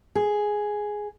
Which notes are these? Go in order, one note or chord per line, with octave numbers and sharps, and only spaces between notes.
G#4